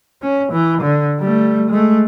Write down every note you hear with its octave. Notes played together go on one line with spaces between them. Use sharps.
C#4
E3
D3
G3 A3
G#3 A3